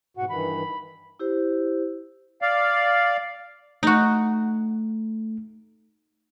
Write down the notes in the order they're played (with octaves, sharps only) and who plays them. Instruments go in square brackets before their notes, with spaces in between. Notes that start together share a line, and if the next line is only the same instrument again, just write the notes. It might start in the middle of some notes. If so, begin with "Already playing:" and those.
[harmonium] G#2 B2 F#4 [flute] F#5
[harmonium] G2 D#3 E3 [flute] B5
[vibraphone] E4 G4 C5
[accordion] D5 F5
[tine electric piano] A3 [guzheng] D#4 F#4